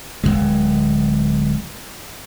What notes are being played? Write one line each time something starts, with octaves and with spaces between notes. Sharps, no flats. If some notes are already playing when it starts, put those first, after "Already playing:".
D1 E2 G#3